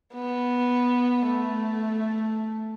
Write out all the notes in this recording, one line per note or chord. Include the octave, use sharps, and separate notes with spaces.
B3
A3